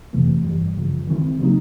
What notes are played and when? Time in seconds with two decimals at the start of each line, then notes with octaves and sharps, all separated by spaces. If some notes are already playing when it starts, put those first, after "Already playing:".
0.13 F2 C3 E3 A3
0.45 G2 E3 G3
0.76 F#2 C#3 F3
1.07 D#3 G#3 C4 E4
1.39 C#3 F#3 A#3 D#4